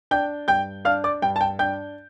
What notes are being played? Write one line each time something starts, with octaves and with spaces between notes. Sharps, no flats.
D4 G5 G6
G2 G5 G6
D4 F5 F6
D5 D6
G2 G5
A5
G5
D4 G5 G6